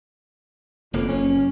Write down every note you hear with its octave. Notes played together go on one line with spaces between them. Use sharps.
F#1 F2 A#3
C#4